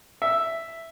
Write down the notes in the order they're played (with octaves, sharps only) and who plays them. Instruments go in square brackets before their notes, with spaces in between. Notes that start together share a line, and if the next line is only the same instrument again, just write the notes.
[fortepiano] E5